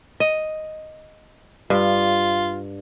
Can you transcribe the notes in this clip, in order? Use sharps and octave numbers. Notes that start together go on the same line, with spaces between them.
D#5
G2 F4